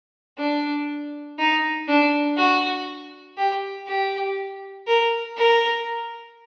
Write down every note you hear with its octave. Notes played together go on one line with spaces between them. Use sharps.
D4
D#4
D4
F#4
G4
G4
A#4
A#4